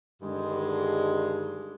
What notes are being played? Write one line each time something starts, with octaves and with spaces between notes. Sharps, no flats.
G2 D3 D#3 G#3